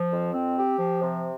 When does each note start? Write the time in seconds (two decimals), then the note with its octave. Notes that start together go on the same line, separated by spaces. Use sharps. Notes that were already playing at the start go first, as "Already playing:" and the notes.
Already playing: F3
0.12 F2
0.34 C4
0.56 G4
0.79 F3
1.01 C3